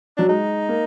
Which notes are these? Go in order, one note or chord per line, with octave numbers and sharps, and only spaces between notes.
F#3 D4
G#3 D#4
A#3